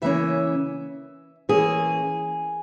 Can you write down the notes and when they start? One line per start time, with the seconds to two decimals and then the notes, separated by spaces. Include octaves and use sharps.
0.02 C#3 E3 A#3 C#4 E5
1.49 E3 A#3 C#4 G#4